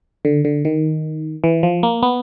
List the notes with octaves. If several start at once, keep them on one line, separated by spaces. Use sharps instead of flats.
D3
D3
D#3
E3
F3
A#3
B3